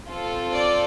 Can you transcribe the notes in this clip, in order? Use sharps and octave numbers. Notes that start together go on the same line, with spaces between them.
C4 F4 A4
D5